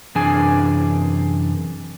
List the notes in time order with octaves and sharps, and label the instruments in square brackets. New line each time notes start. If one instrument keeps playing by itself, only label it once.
[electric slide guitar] F#2 C3 E3 D4 G#4 G#5